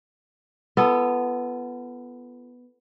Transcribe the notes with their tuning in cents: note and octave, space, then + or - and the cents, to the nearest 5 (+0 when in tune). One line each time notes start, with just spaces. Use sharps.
B3 +0 F4 -35 A4 +0